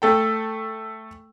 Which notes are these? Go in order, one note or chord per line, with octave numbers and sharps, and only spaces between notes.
A3 A4 G5